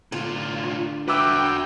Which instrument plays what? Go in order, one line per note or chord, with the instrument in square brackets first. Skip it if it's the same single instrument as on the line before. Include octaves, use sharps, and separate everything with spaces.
[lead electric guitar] A2 F4 [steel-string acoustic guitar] D3
[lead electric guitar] F#4 E5 [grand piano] B4 D6 E6 [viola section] G5